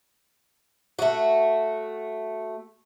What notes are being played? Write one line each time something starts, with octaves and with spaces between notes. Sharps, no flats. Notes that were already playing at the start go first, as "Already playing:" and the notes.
A3 F#4